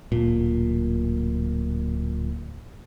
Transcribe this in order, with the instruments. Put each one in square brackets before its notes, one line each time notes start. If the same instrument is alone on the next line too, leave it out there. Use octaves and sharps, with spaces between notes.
[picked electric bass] D1 A#2